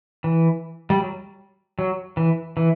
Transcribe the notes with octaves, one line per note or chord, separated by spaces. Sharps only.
E3
G3
F#3
F#3
E3
E3